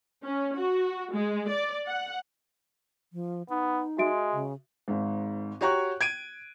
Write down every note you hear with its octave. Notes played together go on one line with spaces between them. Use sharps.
C#4
F#4
G#3
D5
F#5
F3
B3 D#4
G#3 F#4 E5 D7
C#3
G#1 G#2
F#4 G4 C#5 A#5 C#6 F#6
G#6 D7 D#7